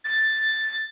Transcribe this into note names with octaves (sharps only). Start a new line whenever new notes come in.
A6